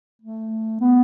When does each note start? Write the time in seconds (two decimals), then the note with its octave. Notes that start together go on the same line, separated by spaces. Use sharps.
0.22 A3
0.81 B3